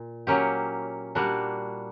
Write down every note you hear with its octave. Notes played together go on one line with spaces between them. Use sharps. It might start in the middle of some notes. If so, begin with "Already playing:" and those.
Already playing: A#2
F#3 A#3 C#4 G4
A#2 G3 A#3 D4 F#4